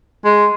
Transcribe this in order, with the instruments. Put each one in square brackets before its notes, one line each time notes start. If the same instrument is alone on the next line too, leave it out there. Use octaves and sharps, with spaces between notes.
[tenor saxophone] G#3